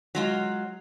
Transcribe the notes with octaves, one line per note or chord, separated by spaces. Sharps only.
F#3 G#3 F4